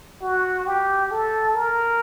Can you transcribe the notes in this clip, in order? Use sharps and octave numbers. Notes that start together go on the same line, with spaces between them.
F#4
G4
A4
A#4